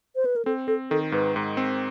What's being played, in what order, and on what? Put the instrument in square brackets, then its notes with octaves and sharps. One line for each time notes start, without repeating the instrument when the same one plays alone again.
[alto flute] C5
B4
A#4
[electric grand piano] C4 [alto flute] A4
[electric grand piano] C4 [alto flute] A4
[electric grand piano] D#3 [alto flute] A4
[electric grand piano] G#2 [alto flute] B4
[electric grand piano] G#2
C4